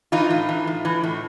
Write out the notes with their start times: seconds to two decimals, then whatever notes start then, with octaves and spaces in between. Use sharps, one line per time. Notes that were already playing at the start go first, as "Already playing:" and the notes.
0.12 E3 D#4 F4
0.31 A2
0.49 E3
0.67 A2
0.85 E3
1.04 A2